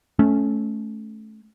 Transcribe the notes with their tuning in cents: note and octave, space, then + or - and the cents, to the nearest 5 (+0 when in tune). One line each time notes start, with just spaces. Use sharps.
A3 -20 C#4 +0